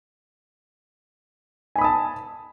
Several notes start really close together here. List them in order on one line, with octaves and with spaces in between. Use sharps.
G#5 B5 D#6 A5